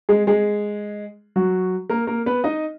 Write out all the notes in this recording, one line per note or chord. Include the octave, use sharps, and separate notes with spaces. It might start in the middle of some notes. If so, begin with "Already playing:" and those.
G#3 G#4
G#3 G#4
F#3 F#4
A#3 A#4
A#3 A#4
B3 B4
D#4 D#5